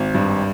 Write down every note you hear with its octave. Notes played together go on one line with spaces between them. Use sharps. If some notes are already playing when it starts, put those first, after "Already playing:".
Already playing: G#1
G2